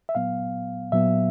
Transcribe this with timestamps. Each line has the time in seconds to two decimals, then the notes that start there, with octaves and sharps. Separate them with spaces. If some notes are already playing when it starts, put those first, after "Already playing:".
0.09 E5
0.15 A#2 F#3 B3 F5
0.92 A#2 F#3 B3 E5